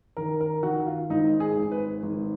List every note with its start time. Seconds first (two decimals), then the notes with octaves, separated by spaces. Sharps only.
0.17 D#3 A#4
0.41 A#4
0.63 D#3 F#4
0.86 F4
1.09 G#1 D#4
1.40 G#4
1.57 G#1
1.72 B4
2.03 G#1